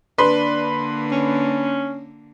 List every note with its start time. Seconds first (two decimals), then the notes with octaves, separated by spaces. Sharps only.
0.18 D3 A#3 D4 B4 C6
1.12 C#4